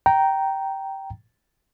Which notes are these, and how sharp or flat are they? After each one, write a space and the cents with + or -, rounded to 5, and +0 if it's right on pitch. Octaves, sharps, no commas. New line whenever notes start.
G5 -10 A#5 +0